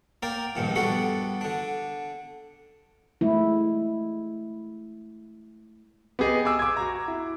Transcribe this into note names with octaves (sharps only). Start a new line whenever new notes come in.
A#3 A#4 D5 G5
A#1 G2 A#2 D#3
G3 B3 D4 F#4 A4
D3 D4
G#3 A3 E4
B3 G4 G#4 D#5
G#5 D6 E6
D6 G#6
F#4 A#5
E4